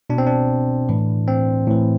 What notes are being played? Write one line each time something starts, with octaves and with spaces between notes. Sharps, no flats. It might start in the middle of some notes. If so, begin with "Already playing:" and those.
B2 D4
C4
D4
A2 E3
C4
A2 E3